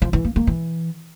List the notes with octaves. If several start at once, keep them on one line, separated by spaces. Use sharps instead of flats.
F3
E3
A#3
A#3
E3